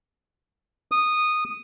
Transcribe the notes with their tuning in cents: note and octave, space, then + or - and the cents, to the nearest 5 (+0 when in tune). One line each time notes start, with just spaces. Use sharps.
D#6 -10